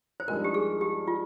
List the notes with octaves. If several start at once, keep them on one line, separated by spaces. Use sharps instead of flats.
C5
G2 F3 G#3 D#4 A#4
G4
G#4
G4
F4